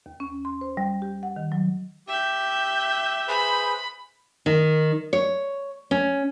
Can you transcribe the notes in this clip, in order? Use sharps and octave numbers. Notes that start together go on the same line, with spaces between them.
D#2
C#4
C6
C5
G3
G4
F#5
D#3
F#3
G4 E5 G6
G#4 B4 C5 B5
D#3
C#5
C#4